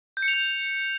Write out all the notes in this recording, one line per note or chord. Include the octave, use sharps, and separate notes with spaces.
G6
C#7
F7
G6